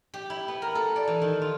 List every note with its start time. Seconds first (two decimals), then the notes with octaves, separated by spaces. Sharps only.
0.14 G4
0.30 E4
0.48 B3
0.62 A#4
0.75 A4
0.96 D5
1.07 E3
1.22 D#3
1.42 F4